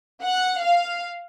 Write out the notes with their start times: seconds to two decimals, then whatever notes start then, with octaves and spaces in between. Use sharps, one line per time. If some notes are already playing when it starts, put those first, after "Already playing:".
0.23 F#5
0.61 F5